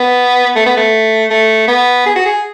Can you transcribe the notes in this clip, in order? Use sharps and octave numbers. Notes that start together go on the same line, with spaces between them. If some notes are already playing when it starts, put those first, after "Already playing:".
Already playing: B3
A3
B3
A3
A3
B3
G#4
F#4
G#4